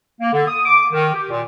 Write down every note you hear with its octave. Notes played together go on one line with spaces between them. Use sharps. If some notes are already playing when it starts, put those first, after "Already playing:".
A#3
D3
D#6
D6
D#3
G4
A#2